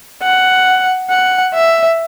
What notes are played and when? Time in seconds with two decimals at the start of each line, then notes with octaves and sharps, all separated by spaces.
0.23 F#5
1.10 F#5
1.54 E5